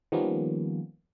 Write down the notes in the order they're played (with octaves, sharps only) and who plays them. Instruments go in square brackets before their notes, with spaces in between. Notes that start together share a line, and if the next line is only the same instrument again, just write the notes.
[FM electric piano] D#3 F3 G3 A#3 B3 C#4